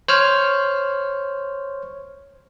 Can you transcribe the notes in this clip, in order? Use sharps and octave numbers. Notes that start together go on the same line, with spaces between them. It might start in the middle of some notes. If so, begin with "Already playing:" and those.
C5 C#5 F6